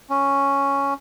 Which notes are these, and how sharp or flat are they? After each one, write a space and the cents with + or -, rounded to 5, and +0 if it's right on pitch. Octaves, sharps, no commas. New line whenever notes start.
C#4 +0